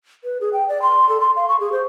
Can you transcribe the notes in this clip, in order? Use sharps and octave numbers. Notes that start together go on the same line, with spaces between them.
B4
G#4
G5
D5
C6
A4
C6
F5
C#6
G#4
C5